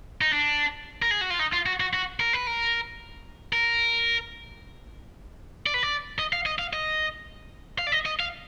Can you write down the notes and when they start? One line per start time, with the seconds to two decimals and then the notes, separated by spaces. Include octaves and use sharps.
0.21 D#4
0.33 D4
1.02 A#4
1.11 G#4
1.21 F#4
1.30 F4
1.39 D#4
1.53 F4
1.66 F#4
1.80 F#4
1.93 F#4
2.20 A#4
2.33 B4
2.47 A#4
3.53 A#4
5.66 D5
5.74 B4
5.83 D5
6.19 D#5
6.33 F5
6.46 D#5
6.59 F5
6.73 D#5
7.79 F5
7.87 D5
7.92 D#5
8.06 D#5
8.20 F5